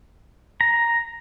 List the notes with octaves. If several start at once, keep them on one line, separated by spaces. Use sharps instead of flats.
A#5